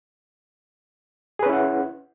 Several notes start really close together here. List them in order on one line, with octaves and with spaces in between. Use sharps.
G#4 B4 C#4 E4 F#5